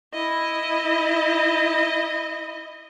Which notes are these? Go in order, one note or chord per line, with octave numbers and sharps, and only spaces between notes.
E4 D#5